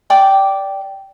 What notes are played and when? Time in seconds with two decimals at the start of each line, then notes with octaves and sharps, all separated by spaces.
0.10 D5 G5 D6